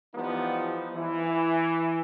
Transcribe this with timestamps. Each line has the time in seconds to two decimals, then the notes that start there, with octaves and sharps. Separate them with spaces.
0.15 E3 F3 G3 B3 D#4
0.91 E3